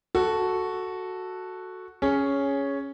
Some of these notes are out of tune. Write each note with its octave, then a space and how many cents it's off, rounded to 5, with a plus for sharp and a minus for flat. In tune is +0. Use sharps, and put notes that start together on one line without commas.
F#4 +0 A4 +0
C#4 +5 G#4 +0 C#5 +0